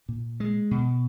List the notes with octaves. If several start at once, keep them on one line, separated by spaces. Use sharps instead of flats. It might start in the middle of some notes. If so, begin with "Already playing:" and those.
A#2
G#3
B2